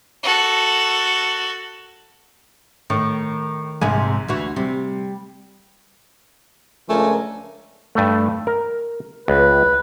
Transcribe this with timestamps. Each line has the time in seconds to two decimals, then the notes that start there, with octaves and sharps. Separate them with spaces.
0.23 F#4 A4
2.90 A2 D#3
3.81 A#1 G#2 C3 G#5
4.28 D2 E3 F#4
4.56 C3 G3
6.89 C#2 F3 A3 D4 A#4 G#5
7.95 G2 A3
8.47 A#4
9.28 C#2 B4